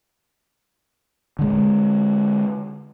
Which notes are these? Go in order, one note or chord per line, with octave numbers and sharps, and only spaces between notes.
D3 G#3